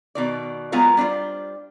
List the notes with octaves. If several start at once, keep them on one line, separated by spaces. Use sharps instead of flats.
B2 D#3 D5
F#3 G#3 B3 F4 A#4 B4
G3 D4 F4 C5